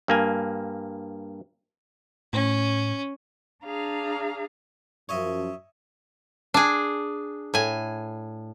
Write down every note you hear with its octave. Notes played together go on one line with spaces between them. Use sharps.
G2 A#3 G#5
A2 C#4
D4 G#4 F5 A#5
F#2 F3 C#5 D#5 E5
D4 G#4
A2 G#5